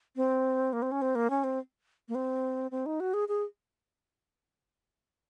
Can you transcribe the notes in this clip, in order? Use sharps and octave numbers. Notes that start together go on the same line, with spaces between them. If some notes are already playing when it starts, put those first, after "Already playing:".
C4
A#3
C4
C#4
C4
A#3
C#4
C4
A#3
C4
C4
D#4
F#4
G#4
G#4